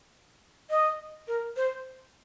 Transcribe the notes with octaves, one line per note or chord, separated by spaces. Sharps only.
D#5
A#4
C5